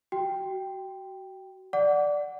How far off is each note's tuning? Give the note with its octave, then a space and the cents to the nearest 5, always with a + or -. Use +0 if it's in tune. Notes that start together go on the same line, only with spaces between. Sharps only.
F#4 +25 G5 +0
D5 +0 F#5 +0 D6 -30